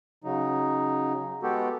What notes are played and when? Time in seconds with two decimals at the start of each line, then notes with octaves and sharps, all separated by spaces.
0.24 C#3 F#3 D#4
1.43 G#3 B3 F#4 G4 A4